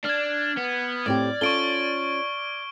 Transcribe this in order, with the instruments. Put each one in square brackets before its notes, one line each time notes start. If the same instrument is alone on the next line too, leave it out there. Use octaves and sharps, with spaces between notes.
[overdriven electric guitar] D4 [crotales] F6 G#6
[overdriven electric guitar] B3
[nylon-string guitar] A2 C4 G4 [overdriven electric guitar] D5
[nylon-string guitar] C#4 F4 A4 [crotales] C#6 D7 G7